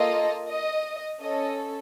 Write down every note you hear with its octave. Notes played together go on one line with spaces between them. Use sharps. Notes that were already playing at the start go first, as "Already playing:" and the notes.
Already playing: A#3 F4 A4 D#5
D#5
C#4 A4 D#5